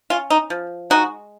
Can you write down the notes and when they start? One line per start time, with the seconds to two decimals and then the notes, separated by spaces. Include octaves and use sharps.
0.10 C#4 F4
0.30 D#4
0.50 F3
0.90 G#3 D#4 F#4